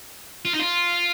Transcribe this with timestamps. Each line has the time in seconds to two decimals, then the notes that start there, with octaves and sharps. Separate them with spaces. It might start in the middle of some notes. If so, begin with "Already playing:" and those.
0.45 F4
0.53 D#4
0.59 F4